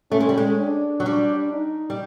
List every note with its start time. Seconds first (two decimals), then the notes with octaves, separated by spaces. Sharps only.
0.11 A3 C#4
0.20 G#3
0.29 G3
0.38 G#3
0.59 D4
1.00 F#3
1.06 G3 D4
1.53 D#4
1.90 G3